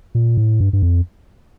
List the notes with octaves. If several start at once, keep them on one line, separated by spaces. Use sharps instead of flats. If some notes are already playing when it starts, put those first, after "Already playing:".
A#2
A2
G2
G2
F2